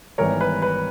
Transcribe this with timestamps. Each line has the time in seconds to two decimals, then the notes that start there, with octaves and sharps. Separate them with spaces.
0.18 G#1 G#2 E3 G3 B3 A#4 C#5
0.41 B4
0.62 B4